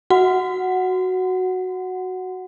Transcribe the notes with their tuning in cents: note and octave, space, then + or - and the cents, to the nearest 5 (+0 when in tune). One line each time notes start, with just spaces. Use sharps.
F#4 +0 F#5 +0